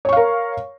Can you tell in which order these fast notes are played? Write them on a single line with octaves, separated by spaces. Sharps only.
C#5 C#6 F5 A#4